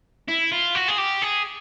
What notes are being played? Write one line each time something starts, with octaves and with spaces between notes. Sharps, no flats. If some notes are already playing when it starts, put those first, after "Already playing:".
E4
F4
F#4
G#4
G4
G#4